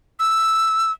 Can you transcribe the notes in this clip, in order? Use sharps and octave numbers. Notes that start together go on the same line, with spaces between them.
E6